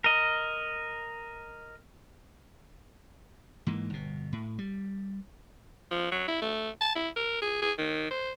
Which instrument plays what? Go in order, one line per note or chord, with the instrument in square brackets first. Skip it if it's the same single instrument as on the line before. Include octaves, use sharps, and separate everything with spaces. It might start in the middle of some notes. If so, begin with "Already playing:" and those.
[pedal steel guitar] A#4 D#5
[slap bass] G#2 E3 A#3
G1 B2
A2
G3
[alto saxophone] F3
F#3
E4
A3
A5
E4
A#4
G#4
G#4
D#3
C5